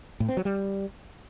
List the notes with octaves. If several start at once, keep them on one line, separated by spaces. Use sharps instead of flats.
A2
C4
F#3
G3